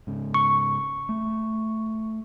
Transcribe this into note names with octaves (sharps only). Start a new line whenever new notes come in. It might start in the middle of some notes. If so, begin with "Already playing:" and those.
G#2 C#3
C#6
A3